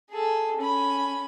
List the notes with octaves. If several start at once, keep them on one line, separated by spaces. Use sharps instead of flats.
G#4 A4
C#4 B5